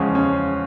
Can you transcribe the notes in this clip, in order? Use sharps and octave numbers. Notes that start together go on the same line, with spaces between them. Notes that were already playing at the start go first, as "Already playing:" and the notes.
Already playing: E2 C#3 F3 G#3 C#4
C#4